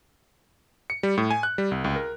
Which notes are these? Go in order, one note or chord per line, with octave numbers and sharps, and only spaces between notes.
C#7
G3
A2
G#5
F#6
G3
C2
C#2
A#4